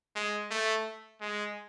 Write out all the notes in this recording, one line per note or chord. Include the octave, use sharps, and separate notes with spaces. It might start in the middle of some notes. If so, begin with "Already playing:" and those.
G#3
A3
G#3